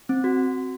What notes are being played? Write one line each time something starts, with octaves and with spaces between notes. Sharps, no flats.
C4
F#4